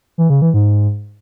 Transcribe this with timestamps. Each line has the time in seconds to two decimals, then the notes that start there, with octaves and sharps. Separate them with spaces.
0.18 E3
0.30 C#3
0.42 E3
0.54 G#2